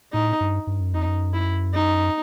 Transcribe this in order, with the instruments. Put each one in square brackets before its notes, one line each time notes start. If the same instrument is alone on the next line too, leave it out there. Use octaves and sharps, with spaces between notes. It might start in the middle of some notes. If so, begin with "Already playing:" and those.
[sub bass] A2 [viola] D#4
[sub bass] G2
G2
F#2
[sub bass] F2 [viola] D#4
[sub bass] F#2
[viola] E4
D#4